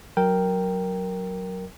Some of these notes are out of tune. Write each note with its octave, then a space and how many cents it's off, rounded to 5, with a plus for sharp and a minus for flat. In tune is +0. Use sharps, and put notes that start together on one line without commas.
F#3 +0 A#4 +0 G5 +0